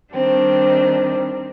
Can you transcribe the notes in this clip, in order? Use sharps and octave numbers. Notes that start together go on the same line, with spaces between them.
D#3 G3 C4 D4